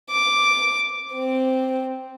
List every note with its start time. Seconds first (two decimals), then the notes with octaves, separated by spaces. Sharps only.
0.10 D6
1.14 C4